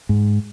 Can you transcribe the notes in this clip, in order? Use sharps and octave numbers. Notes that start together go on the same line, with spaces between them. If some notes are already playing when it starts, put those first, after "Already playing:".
G#2